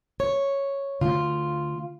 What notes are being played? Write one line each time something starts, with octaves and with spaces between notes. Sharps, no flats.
C#5
D3 A3 F4